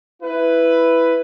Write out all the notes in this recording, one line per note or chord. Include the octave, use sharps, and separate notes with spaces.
E4 B4